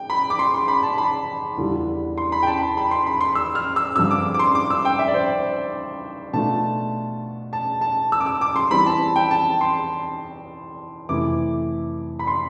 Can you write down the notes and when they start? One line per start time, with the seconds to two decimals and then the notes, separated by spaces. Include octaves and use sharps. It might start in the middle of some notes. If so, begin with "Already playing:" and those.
Already playing: G5
0.10 B5
0.30 D6
0.39 C6
0.54 C6
0.68 B5
0.83 A5
0.98 B5
1.57 E2 D3 G3 D4 F4
2.18 C6
2.32 B5
2.43 G5
2.47 A5
2.62 B5
2.77 B5
2.91 C6
3.06 B5
3.21 C6
3.35 E6
3.55 F6
3.76 E6
3.96 G2 D3 F3 C4 E6
4.11 D6
4.34 D6
4.39 C6
4.55 D6
4.70 E6
4.85 G5
4.99 E5
5.08 D5
5.14 C5
6.33 B2 A3 D4 F4 A5
7.53 A5
7.81 A5
8.12 E6
8.20 D6
8.26 E6
8.41 D6
8.56 C6
8.70 E3 G3 C4 B5
8.86 A5
9.16 G5
9.31 A5
9.61 C6
11.09 F2 C3 E3 A3 E4 D6
12.19 B5
12.27 C6